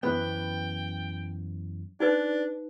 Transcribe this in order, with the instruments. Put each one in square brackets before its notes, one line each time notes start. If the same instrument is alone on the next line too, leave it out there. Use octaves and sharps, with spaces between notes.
[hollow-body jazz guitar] F#2 E3 B3 [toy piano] C5 [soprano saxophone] G5
[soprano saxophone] D4 [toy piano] D#4 B4 C5